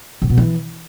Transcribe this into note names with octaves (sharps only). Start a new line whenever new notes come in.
C3
B2
E3